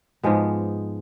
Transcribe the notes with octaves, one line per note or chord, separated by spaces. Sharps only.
G#2 F3 G#3 B3